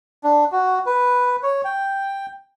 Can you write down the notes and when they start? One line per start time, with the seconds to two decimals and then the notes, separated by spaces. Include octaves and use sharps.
0.24 D4
0.52 F#4
0.86 B4
1.43 C#5
1.65 G5